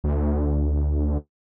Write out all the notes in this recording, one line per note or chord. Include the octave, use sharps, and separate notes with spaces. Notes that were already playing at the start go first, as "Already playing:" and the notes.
D2